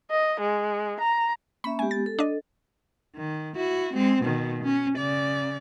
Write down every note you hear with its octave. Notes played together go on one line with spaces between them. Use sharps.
D#5
G#3
A#5
A#3 C#4 E5 B5
G#3 B3 G4 G#5
A6
A4
D4 D#5
D#3
E4 F#4
G#3 C4
B2 D#3
C#4
C#3 D5